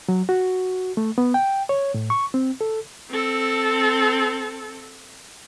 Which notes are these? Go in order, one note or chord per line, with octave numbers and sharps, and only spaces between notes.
F#3
F#4
A3
B3
G5
C#5
A2
C#6
C4
A4
C4 A4